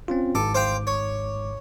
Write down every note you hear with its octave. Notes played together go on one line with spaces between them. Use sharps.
C4 C#4 F4
G#1 G#2 A4 D6
C5 F5 G5
C#5